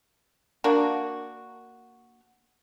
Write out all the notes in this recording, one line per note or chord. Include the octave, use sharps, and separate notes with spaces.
A#3 D4 F#4